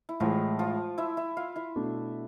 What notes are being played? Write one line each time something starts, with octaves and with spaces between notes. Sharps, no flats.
E4
A2 E3 F3 G#3 F4
F3 F4
E4 E5
E4 E5
F4 F5
E4 E5
B2 A3 D4